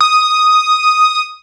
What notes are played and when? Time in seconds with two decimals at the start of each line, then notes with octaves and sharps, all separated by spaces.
0.01 D#6